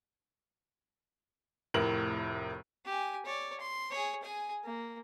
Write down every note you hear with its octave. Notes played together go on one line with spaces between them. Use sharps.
F1 A2 A#4 F#7
G4 G#5
C#5 D5
C6
G#4 C#5
G#4 G#5
A#3